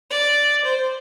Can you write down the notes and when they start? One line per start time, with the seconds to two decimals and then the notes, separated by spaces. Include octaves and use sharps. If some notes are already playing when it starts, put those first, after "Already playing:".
0.11 D5
0.65 C5